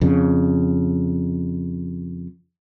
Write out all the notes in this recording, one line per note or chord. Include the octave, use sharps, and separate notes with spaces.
F2 C#3